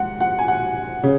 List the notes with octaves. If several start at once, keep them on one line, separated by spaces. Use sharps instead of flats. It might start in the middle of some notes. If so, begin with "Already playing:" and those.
Already playing: G#2 F#5
F#5
G#5
F#5
C#3